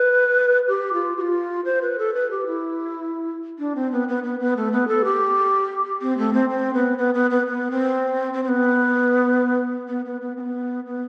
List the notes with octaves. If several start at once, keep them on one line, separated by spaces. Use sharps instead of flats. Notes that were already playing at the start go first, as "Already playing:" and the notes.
Already playing: B4
G4
F4
G4
F4
C5
B4
A4
B4
G4
E4
D4
C4
B3
B3
B3
B3
A3
B3
A4
G4
C4
A3
C4
C4
B3
B3
B3
B3
B3
C4
C4
C4
B3
B3
B3
B3
C4
B3
B3